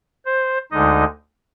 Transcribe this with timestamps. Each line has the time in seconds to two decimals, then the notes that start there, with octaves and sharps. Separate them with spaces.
0.26 C5
0.71 D2 D3 G#3 D#4 D#5